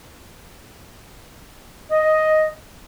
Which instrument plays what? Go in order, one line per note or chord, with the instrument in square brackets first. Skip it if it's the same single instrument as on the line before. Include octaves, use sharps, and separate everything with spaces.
[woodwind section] D#5